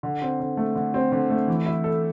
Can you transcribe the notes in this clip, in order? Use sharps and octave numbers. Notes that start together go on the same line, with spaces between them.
D3
C4
D3
A3
D3
C4
D3
A3
E3
E4
A4